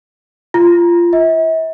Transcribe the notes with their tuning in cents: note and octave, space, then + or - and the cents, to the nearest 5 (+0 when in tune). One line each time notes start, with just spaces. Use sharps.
F4 -20
E5 -40